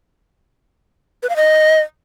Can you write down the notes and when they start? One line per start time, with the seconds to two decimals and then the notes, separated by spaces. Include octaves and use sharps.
1.23 B4
1.29 F5
1.36 D#5